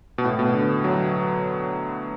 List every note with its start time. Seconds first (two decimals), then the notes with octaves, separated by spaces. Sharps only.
0.18 B2
0.24 A2
0.39 B2
0.54 D3
0.84 F#3